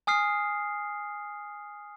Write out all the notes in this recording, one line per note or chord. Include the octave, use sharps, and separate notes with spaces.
G#5 D#6 F6 C7